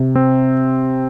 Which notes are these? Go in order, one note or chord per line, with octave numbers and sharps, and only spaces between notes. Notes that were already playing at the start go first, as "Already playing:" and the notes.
Already playing: C3
C4